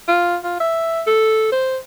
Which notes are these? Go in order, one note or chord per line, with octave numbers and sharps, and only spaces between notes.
F4
F4
E5
A4
C5